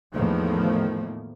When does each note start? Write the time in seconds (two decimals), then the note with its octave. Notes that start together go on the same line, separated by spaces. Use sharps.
0.15 E2 A2 D#3 F3 A3 A#3